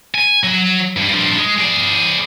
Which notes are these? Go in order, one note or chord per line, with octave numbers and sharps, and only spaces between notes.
G#5
F#3
G2
G2 F3
G#3
G#4 D5